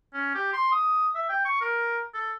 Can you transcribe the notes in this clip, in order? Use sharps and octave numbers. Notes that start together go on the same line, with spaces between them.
C#4
G4
C6
D#6
E5
G5
C#6
A#4
A4